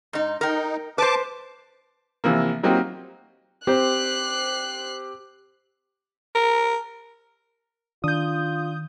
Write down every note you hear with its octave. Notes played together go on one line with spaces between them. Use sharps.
G#2 D#4
D#4 A#4 G5
B4 C5 A5 D6
C3 E3 F3 A#3
F#3 A#3 C4 D#4 F4 G4
C4 G4 C5 F#6 C7
A#4
D#3 D4 F4 D#6 G6